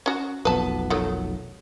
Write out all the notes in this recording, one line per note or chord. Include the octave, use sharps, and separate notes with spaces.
C#4 F#4
F1 B1 B3 B4 A5
D#3 F#3 A3